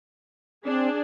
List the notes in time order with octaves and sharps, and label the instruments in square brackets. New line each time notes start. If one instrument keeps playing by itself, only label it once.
[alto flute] C4 [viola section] D4 G#4